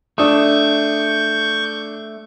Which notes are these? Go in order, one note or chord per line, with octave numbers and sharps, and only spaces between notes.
A3 D4 C#6 D#6 G6